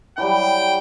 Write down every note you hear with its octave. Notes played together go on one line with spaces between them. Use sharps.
E3 F#3 G3 G5